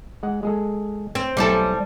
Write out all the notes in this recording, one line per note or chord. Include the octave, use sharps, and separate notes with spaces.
G#3 F#5
G#3 G#4 A4
C4
B1 G3 C4 E4 A4 G#5